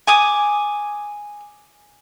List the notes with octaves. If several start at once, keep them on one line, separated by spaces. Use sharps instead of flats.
G#5 D6 D#6